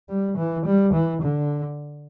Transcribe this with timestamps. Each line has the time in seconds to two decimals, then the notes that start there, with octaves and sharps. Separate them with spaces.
0.09 G3
0.37 E3
0.66 G3
0.94 E3
1.22 D3